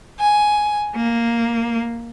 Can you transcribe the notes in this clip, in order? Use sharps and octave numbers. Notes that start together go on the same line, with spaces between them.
G#5
A#3